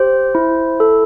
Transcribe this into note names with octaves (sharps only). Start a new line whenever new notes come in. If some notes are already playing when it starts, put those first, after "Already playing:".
Already playing: G4 C5
E4
A4